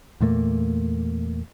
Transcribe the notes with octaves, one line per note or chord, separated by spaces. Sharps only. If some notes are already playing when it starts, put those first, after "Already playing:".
E2 A#2 A3 A#3